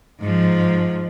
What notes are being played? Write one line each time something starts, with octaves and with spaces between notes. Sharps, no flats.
G#2 F3